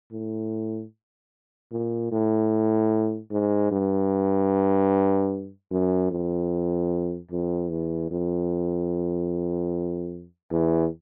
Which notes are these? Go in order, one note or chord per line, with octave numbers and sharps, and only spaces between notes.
A2
A#2
A2
G#2
G2
F#2
F2
F2
E2
F2
E2